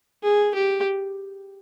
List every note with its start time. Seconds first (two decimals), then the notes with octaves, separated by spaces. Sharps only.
0.23 G#4
0.54 G4